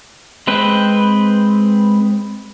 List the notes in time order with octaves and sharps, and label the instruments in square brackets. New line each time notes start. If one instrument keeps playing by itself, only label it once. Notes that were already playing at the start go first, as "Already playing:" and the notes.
[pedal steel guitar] G#3 C4 B4